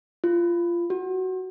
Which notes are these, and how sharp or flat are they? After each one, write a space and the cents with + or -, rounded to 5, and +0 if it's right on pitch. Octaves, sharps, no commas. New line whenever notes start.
F4 -20
F#4 +10